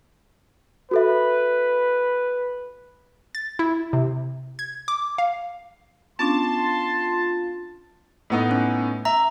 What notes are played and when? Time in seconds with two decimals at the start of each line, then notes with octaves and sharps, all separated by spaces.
0.91 F#4 A4 B4 E5
3.35 A6
3.59 E4
3.93 C3
4.59 G#6
4.88 D6
5.18 F5
6.19 B3 C#4 D4 F4 A5 C6
8.30 A2 B3 D#4
8.51 C#4
9.05 E5 A#5